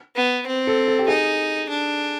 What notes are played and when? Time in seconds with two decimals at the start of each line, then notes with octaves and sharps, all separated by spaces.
0.16 B3
0.47 C4
0.67 A4
0.88 A4
0.99 G4
1.08 D#4 G#4
1.70 D4